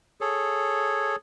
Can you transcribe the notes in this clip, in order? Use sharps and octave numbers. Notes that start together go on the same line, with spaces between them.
G#4 A4 C#5